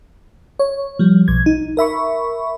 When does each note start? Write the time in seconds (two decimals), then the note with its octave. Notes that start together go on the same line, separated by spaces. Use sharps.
0.59 C#5
0.99 F3 G3
1.28 B1 G#6
1.46 D#4
1.77 A#4 E5 B5 C#6